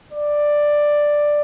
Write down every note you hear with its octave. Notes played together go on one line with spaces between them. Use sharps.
D5